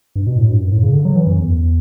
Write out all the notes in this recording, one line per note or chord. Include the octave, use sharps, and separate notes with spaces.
G2
B2
A2
G2
F#2
A2
C#3
D3
F#3
E3
F#2
E2